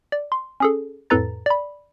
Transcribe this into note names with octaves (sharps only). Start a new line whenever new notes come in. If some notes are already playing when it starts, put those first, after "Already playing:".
D5
C6
C#4 G#4 A4
F2 A2 A4 B4 A#5 A6
D5 B5